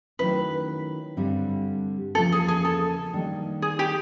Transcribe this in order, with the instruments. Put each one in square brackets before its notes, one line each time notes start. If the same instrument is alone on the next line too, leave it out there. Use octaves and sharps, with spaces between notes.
[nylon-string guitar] D#3 F#3 A3 C#4 E4 [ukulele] B4
[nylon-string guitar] G2 D3 G3 C4
[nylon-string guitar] E2 C#3 F3 A#3 [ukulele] A4
[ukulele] G#4
G#4
A4
[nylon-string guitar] D#3 G3 A#3 D4
[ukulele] G#4
G4